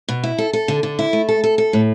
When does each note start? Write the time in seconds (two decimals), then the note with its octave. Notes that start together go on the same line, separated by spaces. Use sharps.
0.08 B2
0.23 E4
0.38 A4
0.53 A4
0.68 D3
0.83 D3
0.99 E4
1.13 A3
1.28 A4
1.44 A4
1.58 A4
1.73 A2